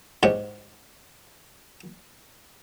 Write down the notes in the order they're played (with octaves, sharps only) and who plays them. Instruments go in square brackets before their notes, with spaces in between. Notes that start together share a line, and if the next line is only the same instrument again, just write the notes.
[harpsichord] G#2 G4 C#5